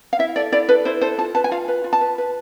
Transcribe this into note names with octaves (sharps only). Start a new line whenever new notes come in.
F5
E4 E5
A4 D5
E4 D5
A4 B4
E4 C5
A4 C5
F4 A5
B4 A5
G#5
F4 F5
B4
F4
A5
B4
B4